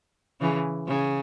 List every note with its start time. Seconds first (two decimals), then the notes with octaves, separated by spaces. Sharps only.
0.40 C#3 E3
0.88 C#3